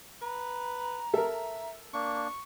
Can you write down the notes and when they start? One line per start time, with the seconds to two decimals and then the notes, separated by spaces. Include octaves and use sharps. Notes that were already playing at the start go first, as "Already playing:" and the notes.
0.22 B4 A#5
1.14 A4 A#4 E5
1.94 A#3 D4 C#6